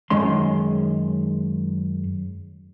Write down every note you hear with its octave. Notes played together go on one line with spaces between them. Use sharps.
F#2 D#3 G#3 C#4 C6